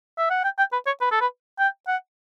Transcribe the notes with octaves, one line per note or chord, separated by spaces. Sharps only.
E5
F#5
G5
G5
B4
C#5
B4
A4
B4
G5
F#5